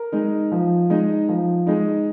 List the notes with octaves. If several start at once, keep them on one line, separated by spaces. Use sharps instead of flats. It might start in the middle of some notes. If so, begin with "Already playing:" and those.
Already playing: A#4
G#3 D#4
F3
G#3 D#4
F3
G#3 D#4